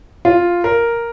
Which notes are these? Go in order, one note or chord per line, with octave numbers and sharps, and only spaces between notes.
F4
A#4